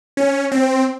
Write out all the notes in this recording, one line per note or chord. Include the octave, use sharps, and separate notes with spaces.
C#4
C4